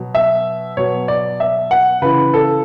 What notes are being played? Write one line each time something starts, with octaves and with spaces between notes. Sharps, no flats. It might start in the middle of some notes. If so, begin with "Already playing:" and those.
Already playing: B2 F#3
E5
B2 F#3 C#5
D5
E5
F#5
C#3 E3 B4
A4